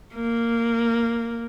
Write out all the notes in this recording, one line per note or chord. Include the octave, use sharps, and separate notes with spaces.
A#3